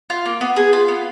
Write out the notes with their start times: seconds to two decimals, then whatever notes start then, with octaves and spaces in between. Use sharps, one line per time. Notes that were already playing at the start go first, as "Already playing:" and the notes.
0.10 F4
0.25 A#3
0.41 B3
0.56 G#4
0.73 F4
0.88 B3